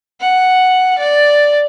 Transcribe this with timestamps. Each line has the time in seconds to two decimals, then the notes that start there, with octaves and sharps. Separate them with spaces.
0.20 F#5
0.98 D5